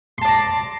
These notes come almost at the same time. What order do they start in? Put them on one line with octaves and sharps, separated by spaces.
C6 A5 D5 A#5